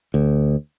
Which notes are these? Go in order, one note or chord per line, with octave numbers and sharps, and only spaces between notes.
D2